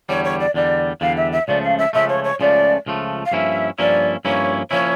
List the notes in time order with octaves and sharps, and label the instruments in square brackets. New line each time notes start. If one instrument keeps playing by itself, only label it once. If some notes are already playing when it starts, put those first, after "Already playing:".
[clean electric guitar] E2 D3 G3 [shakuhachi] C#5
[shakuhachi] C#5
D5
[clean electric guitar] E2 D3 G3 [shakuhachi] D5
[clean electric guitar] E2 D3 G3 [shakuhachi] F5
[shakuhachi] E5
E5
[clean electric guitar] C#2 C#3 F3 A3 [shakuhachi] D5
[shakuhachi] F5
E5
[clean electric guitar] C#2 C#3 F3 A3 [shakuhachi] E5
[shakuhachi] C#5
C#5
[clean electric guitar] C#2 C#3 F3 A3 [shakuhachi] D5
[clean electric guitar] C#2 C#3 F3 A3
[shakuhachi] F5
[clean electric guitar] G2 F3 A#3 C#4 E4 [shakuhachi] E5
[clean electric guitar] G2 F3 A#3 C#4 E4 [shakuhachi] D5
[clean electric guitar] G2 F3 A#3 C#4 E4 [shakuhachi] C#5
[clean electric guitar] F3 A#3 C#4 E4 [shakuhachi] C#5